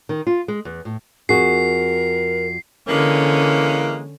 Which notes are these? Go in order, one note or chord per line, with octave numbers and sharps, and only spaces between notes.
D#3
F4
G#3
E2
A2
F2 F#4 G#4 A#4 C7
D3 E3 G#3 A#3 C#4